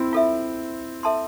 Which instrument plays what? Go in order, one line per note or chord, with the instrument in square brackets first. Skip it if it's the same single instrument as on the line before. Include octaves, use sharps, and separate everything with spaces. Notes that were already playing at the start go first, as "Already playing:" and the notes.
Already playing: [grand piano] C4 E4
[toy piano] F4 A4 E5
A4 E5 A5 C6